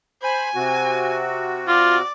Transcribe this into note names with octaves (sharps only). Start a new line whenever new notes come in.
C5 G#5 B5
C3 C4 F#4
F4 D5